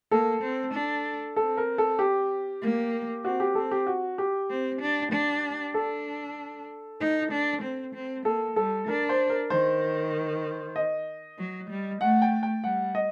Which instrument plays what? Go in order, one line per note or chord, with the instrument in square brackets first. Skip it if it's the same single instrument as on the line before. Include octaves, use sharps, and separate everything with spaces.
[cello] A#3 [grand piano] A4
[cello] C4
D4
[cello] C4 [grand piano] A4
[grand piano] A#4
A4
G4
[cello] A#3
[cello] C4 [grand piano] F#4
[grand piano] G4
[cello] C4 [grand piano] A4
[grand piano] G4
F#4
G4
[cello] C4
D4
D4
[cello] D4 [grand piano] A4
[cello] D#4
D4
C4
C4
[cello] A#3 [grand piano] A4
[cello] G3 [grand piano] A4
[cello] D4 [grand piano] A#4
[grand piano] C5
A#4
[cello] D#3 [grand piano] C5
[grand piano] D#5
[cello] F#3
G3
[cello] A3 [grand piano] F#5
[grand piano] G5
G5
[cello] G3 [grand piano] F#5
[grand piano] D#5